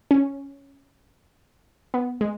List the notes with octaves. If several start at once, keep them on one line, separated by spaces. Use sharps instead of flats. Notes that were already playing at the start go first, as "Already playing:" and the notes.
C#4
B3
G#3